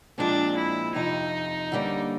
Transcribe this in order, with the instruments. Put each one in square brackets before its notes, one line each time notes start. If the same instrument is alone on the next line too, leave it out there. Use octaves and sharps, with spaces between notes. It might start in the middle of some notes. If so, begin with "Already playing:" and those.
[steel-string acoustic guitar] A#2 F3 G#3 C4 [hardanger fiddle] D4
[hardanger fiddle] E4
[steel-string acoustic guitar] F2 C3 F3 [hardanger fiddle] D#4
[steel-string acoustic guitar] D3 G3 A#3 C#4